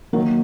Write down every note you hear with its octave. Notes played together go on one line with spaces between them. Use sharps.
D#3 F#3 A#3